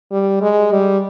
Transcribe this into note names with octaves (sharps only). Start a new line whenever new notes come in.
G3
G#3
G3